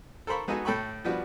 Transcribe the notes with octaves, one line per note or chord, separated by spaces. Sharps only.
A4 A#4 C5 B5 C#6
G#3 B3 D#4 F#4 A4 G#5
A2 A4 G5 B5 C#6
F3 G3 B3 D4 F#4